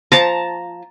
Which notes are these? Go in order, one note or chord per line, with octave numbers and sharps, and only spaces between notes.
F3 A5 A#5